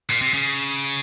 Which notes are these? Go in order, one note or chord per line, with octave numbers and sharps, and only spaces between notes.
A#2
C3
C#3